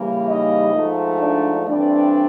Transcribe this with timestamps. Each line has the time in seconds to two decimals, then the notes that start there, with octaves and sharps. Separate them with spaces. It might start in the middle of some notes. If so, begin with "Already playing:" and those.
Already playing: C#3 E3 G3 A#3
0.27 D#4 D#5
0.74 G#2 F3 A3
1.20 D4 D5
1.66 G2 E3 A3 C4 D4 D5